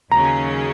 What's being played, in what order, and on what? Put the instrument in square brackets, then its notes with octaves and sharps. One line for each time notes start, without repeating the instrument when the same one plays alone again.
[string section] D#2 C#3 F#3 C#4 [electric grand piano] A#5